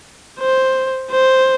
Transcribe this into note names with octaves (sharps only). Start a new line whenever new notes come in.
C5
C5